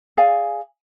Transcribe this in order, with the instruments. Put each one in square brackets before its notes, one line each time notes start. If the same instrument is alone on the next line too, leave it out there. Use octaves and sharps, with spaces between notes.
[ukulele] G#4 D5 F5 G#5